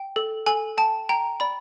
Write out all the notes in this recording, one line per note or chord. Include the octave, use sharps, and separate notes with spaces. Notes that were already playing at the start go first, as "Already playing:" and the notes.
Already playing: G5
A4
A4 G#5
G5 A5
G5 A#5
D5 B5